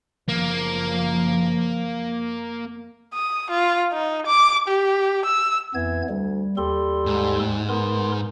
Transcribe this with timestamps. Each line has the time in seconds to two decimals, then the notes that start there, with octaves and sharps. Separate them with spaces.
0.28 F#1 F3 A#3
3.14 D#6
3.51 F4
3.93 D#4
4.26 D6
4.68 G4
5.25 E6
5.75 F2 E3 B3 G#6
6.09 D2 G3
6.57 D#2 G3 A4 C6
7.06 G#2
7.69 B3 A#4 C6